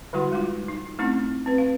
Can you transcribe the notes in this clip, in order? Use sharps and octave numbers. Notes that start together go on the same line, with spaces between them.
D3 G3 E4 F#4 F#5 C6
G3 G#3 D#4 F4
D#4
A3 C4 C#4 D#4 E4
C4 B4
F5